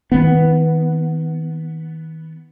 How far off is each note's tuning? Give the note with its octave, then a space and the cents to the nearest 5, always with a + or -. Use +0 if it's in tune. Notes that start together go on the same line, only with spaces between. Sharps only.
D#3 +40 B3 +0